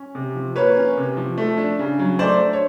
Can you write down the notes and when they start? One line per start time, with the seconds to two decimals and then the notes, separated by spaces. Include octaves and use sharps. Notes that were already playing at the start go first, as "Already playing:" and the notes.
Already playing: C#4
0.15 C3
0.35 F3
0.56 A#3 B4 C#5
0.76 C#4
0.97 C3
1.17 F3
1.38 A3
1.58 D4
1.79 C#3
1.99 F#3
2.19 A3 C5 D5
2.40 D4
2.53 C#5